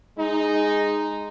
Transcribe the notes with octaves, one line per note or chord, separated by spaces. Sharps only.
G#3 D#4